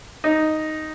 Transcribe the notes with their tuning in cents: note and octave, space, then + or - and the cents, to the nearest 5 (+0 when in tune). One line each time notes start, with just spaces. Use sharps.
D#4 +0